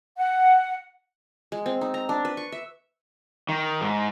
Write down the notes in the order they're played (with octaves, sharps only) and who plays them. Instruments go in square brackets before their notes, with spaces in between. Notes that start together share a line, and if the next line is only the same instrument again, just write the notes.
[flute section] F#5
[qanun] G#3
C4
D#4
A#5
D4
B4
C#6
E5
[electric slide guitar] D#3
G#2